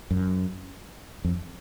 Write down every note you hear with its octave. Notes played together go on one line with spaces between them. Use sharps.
F#2
F2